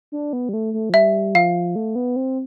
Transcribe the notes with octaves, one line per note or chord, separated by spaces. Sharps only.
D4
B3
G3
A3
A3
F3
G3 E5
F3 F5
A3
B3
C4